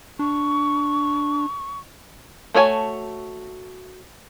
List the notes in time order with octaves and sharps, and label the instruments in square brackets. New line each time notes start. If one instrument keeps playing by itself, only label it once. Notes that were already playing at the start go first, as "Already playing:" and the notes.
[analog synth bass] D4 [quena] C#6
[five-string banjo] A3 F#4 C#5 G#5 A5